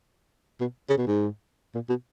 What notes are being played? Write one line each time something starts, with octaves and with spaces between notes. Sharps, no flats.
B2
C#3
B2
G#2
A#2
B2